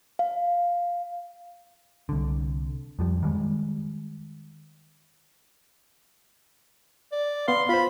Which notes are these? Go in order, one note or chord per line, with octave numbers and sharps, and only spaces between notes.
F5
C2 D3
F2 F3 G3
D#3 E3 G3 G#3
D5
B3 F5 C6
F4 C5 B5